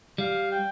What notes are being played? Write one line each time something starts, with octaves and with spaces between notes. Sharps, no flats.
G3 F5
G5